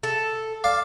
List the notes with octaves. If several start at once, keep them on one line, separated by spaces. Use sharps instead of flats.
A4
D5 F5